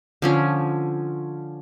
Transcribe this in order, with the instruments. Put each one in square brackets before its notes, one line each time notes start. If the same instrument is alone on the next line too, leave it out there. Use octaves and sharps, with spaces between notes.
[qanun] D3 F3 C#4